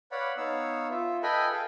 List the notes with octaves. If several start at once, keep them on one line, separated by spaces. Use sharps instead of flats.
B4 C#5 D5 F5 F#5 B5
B3 D#4 C#5 F5 E6
F4 E5
A4 B4 D#5 G5 G#5 B5
G#4 A4 F5 G5